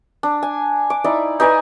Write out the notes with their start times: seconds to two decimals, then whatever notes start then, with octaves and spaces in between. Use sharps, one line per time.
0.23 D4
0.43 G#5
0.90 D6
1.04 D#4 E4 D5
1.40 D#4 B4 D5 G#5